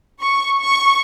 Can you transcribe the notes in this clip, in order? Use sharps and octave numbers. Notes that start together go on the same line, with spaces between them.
C#6
C#6